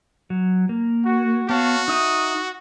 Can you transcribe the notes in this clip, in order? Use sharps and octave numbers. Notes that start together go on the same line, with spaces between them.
F#3
A#3
F#4
B3 F#4 C#5 F5 A5
D#4 E5 D#6